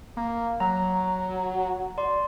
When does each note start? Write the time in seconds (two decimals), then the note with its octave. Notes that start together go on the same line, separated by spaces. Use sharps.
0.17 A#3
0.60 F#3 A#5
1.98 D5 C6